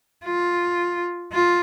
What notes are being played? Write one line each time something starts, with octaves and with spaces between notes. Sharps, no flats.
F4
F4